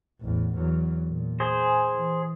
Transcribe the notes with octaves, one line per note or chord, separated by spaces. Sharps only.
A1 E2
E2 F#3
A#2
G#4 C5
E3